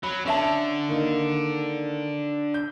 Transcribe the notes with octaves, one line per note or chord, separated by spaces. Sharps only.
F#3 B5
D3 C#4 E5 A5
D#3 A#3 D#4
G6